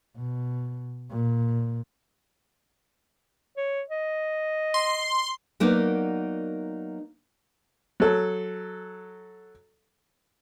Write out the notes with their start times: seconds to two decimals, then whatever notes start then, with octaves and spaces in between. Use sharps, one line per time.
0.17 B2
1.11 A#2
3.57 C#5
3.90 D#5
4.74 C6
5.60 F#3 A#3 B3 D#4 A#4 D5
8.00 F#3 A4